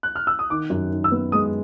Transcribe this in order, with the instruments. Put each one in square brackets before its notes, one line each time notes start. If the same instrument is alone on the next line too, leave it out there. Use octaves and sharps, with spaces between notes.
[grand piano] F#6
F6
E6
D#6
[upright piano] D#3 [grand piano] D6
[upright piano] F#2
D#3
[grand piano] E6
[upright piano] B3
[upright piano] G#3 [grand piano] D#6